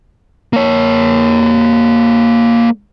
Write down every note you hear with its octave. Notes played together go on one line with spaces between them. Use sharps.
A#3 C#5